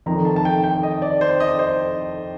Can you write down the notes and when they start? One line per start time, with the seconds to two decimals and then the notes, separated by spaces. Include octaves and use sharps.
0.06 F1 F2 D#3 A#5
0.25 A5
0.36 A5
0.45 G5
0.64 G5
0.83 D#5
1.02 D5
1.21 C5
1.40 D#5
1.59 C5